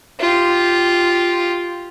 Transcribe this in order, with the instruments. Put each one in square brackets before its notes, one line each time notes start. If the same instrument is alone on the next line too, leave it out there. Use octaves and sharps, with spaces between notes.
[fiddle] F4 G4